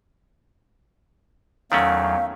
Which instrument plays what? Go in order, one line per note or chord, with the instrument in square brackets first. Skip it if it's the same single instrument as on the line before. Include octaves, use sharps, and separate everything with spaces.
[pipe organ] E2 F#3 [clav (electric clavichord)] D#3 A3 C#4 [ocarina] F5